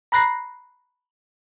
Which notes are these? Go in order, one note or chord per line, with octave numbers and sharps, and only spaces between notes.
A#5 B5 F#6 A#6 C7